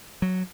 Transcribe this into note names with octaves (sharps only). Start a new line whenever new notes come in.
F#3